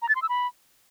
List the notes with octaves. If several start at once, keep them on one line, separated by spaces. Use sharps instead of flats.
A#5
A6
C6
E6
B5